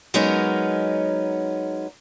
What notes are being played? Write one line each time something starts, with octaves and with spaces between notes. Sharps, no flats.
F#3 G#3 B3 C#4 D#4 A#4